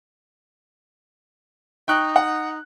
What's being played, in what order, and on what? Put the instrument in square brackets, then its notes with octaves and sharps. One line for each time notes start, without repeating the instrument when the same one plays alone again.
[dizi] D#4 [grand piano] G5 C#6 F#6
[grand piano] F#5